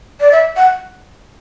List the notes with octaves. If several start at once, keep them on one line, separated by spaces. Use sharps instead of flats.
D5
E5
F#5